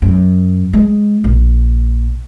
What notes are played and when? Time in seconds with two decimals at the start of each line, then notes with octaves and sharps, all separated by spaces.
0.02 F#2
0.73 G#3
1.24 A#1